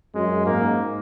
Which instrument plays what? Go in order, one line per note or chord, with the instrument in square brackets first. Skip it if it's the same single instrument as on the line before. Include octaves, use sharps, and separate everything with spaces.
[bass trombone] F#2 [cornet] G#3
[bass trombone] G#2 [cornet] A#3